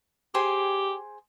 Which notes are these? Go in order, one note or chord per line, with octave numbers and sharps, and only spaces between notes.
G4 G#4 C5 G5